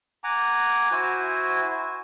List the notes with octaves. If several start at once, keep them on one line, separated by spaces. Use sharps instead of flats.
F#5 G#5 A#5 D6
E4 F#4 C5 G#5